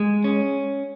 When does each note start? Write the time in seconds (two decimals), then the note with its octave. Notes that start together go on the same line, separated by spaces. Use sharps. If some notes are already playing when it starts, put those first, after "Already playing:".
Already playing: G#3
0.24 C#4